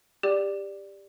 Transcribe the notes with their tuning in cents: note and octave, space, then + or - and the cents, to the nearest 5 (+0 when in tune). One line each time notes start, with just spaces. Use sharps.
G4 +20 D5 +0